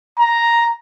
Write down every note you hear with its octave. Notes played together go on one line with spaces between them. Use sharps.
A#5